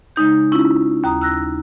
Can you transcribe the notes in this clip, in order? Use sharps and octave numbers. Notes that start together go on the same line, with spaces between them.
C#3 G#3 D#4 G6
C#4 E4 F4
D#2 A#5 D#6
E6 F#6 A#6